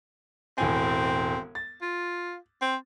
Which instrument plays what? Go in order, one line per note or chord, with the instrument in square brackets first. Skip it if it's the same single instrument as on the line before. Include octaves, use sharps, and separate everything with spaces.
[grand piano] E1 A2 G#5 [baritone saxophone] C4
[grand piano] A6
[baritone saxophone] F4
C4